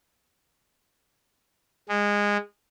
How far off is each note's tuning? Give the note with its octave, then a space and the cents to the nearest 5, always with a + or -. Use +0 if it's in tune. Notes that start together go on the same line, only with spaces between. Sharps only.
G#3 -20